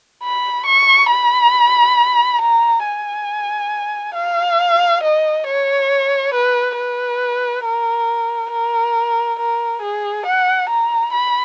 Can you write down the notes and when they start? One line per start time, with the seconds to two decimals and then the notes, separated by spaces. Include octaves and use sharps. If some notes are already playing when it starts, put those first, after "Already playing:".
0.23 B5
0.66 C#6
1.10 B5
2.41 A#5
2.85 G#5
4.15 F5
5.03 D#5
5.46 C#5
6.34 B4
6.77 B4
7.65 A#4
8.51 A#4
9.39 A#4
9.82 G#4
10.26 F#5
10.69 A#5
11.13 B5